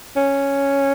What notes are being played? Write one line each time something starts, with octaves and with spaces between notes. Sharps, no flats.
C#4